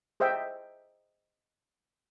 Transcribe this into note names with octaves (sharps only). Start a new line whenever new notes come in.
G#4 C5 D#5 E5 G5